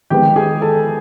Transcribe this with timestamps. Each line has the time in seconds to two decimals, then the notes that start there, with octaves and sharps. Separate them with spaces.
0.10 D#3 G#3 B3 G4 G5
0.36 G#4 G#5
0.61 A4 A5